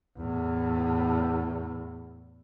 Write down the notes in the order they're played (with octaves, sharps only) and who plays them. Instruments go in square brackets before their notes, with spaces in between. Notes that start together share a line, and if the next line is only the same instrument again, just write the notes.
[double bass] E2 A2